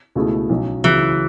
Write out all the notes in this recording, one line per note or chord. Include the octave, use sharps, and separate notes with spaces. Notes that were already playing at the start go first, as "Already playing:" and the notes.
C#2 B2 A3 E4 G#4
B1 B2 F#3 C#4
C#2 C#3 E3 F#3